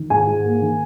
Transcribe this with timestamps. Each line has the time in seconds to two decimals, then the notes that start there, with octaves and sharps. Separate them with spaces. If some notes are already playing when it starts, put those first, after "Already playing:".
Already playing: D#3
0.10 G#2 G#5
0.27 G#2
0.45 A#3
0.61 D#3